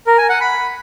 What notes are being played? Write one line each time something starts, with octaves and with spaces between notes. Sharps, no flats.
A#4
G#5
F#5
B5